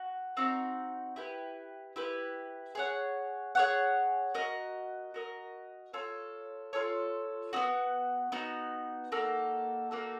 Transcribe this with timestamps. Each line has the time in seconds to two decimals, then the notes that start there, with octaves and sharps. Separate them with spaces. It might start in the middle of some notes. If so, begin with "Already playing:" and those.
Already playing: F#4
0.37 C4 D#4 F#4
1.16 E4 G4 B4
1.96 E4 G4 B4
2.75 G#4 C#5 F#5
3.55 G#4 C#5 F#5
4.34 F#4 A#4 D#5
5.14 F#4 A#4 D#5
5.93 F4 A4 C#5
6.73 F4 A4 C#5
7.53 B3 D#4 F#4
8.32 B3 D#4 F#4
9.12 A#3 D#4 F#4 A4
9.91 A#3 D#4 F#4 A4